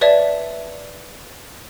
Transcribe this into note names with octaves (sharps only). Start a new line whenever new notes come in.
B4 C#5 D5 E5 A5